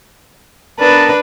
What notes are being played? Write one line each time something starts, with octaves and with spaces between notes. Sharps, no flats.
B3 D4 A#4 B4 A5